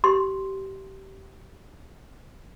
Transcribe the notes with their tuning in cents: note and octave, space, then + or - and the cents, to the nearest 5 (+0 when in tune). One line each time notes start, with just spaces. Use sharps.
G4 -25 C6 +0